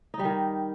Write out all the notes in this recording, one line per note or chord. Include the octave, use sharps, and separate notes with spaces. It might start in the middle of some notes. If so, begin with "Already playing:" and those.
D#4
G3
D#3